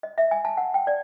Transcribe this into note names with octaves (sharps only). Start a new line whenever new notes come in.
D#5
E5
G#5
A5
F#5
G5
D5